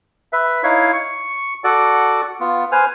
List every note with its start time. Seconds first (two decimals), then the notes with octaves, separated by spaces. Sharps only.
0.33 B4 E5
0.64 D#4 E4 C#5 F5
0.93 C#6
1.64 F#4 A4 D5 F#5
2.40 B3 F4
2.72 B4 C5 G#5 F6